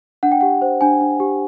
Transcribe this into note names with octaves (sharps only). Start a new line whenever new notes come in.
D4 F#5
G5
G4 F#5
C5
D4 G#5
D4
G4